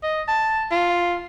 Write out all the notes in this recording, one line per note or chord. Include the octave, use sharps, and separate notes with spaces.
D#5
A5
F4